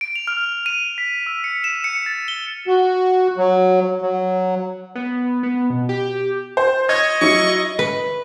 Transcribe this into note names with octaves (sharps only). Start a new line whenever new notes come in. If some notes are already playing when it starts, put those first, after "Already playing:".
D7
F7
F6
D#7
B6
E6
C#7
E7
C#7
A6
G7
F#4
F#3
F#3
B3
B3
B2
G4
C5
C#5 D#5 G#6
F#3 E4 C#6
B4